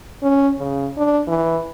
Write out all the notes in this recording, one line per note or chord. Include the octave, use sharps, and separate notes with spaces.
C#4
C#3
D4
E3